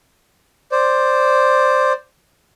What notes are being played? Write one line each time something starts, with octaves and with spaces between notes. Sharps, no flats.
C5 D5